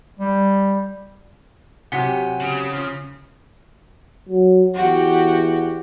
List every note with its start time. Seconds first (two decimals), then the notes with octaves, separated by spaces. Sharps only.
0.19 G3
1.92 C3 F#3 G4 F#5 G#5 B6
2.40 C#3
2.73 F3
4.29 F#3
4.75 E2 F#4 G4